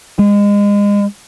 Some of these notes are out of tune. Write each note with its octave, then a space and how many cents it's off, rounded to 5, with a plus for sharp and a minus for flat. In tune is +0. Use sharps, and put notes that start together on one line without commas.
G#3 -30